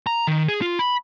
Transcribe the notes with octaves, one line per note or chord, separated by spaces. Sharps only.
A#5
D#3
G#4
F4
B5